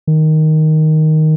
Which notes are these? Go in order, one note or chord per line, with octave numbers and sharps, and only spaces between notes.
D#3